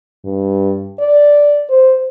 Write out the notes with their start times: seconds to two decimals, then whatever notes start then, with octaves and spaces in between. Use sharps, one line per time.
0.24 G2
0.99 D5
1.69 C5